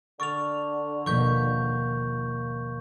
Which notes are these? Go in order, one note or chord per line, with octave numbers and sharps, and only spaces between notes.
D3 C#6 D6 F6 A6 F7
D#2 B2 F3 A#3 C#6 G6 B6